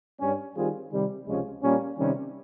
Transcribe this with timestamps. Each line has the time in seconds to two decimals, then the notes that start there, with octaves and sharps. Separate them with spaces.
0.20 G2 G3 C#4
0.56 D#3 G3 C4 F4 G#4
0.92 C3 D#3 G3
1.27 C#2 C3 F3 G#3 C#4
1.62 A#2 G3 A#3 C#4
1.99 C3 D#3 G3 C#4